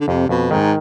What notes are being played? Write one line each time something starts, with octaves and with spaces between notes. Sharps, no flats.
D3
F2 C3
F2 B2
G#2 D#3